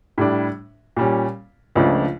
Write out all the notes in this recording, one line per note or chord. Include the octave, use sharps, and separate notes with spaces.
A2 G3 D4
A#2 G3 C#4
C#2 C#3 F3 A3 D4